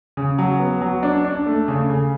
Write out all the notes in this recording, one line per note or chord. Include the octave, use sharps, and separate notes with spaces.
C#3
F#3
B3
F#3
D4
D4
A3
C#3
C#3